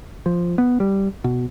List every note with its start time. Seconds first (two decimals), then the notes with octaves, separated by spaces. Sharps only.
0.26 F3
0.58 B3
0.80 G3
1.24 B2